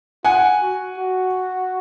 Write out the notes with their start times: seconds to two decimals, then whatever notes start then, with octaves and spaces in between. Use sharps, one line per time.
0.25 F4 F#5 G#5
0.62 F#4
0.98 F#4